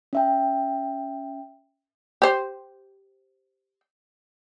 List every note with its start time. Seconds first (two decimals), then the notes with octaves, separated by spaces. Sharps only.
0.13 C#4 E5 G5
2.22 G4 C5